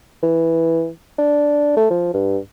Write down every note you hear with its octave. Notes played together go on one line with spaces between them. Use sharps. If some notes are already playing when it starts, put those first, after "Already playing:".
E3
D4
A3
F3
G2